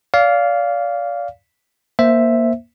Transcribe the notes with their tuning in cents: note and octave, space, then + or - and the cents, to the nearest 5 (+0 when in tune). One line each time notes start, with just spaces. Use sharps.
D5 -35 F5 +0
A#3 +10 C5 +0 E5 +0